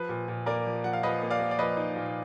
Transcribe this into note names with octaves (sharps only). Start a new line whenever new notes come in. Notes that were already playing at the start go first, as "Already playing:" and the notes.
Already playing: F3 B4
A#2
A#2
A#3 A#4 D5
F3
F3 F#5
F5
F3 B4 D#5
A#3
D5 F5
A#3
D5
F3 B4 D#5
D#4
A#2